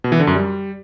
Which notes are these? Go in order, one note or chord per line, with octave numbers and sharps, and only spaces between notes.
B2
E3
D3
F#2
G3